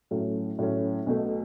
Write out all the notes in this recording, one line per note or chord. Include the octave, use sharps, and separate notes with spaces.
A2 F#3 A3 C#4
A2 F#3 A3 C#4
B1 B2 A3